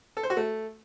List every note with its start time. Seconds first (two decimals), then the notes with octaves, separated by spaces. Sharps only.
0.17 A4
0.23 C5
0.30 F#4
0.37 A3